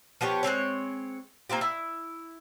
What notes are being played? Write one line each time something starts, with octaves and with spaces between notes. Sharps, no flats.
F3 B3 G4 C#5
G#3 A#3 C4 C#5
A#3 C4 F4 G4
E4